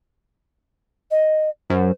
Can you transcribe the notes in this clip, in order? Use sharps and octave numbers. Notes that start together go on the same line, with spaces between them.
D#5
F#2 C5